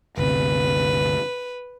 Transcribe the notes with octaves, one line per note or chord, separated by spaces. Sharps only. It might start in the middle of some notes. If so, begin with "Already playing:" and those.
G1 D2 C3 B4